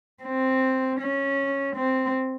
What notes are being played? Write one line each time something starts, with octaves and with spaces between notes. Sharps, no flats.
C4
C#4
C4